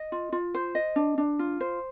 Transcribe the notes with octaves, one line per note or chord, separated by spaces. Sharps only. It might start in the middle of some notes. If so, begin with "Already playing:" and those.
Already playing: D#5
F4
F4
C5
D#5
D4
D4
F4
C5